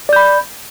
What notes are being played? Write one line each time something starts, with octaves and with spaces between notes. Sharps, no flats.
D5 B5 G6